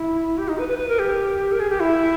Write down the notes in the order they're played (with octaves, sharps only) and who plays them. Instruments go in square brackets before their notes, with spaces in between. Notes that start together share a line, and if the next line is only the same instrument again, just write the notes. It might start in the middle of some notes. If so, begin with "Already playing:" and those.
Already playing: [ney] E4
G4
D#4
B4
B4
B4
A#4
G4
A#4
G#4
G4
E4